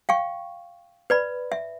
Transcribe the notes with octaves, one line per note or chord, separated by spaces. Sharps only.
F5 G5 C#6
B4 D5 B5
E5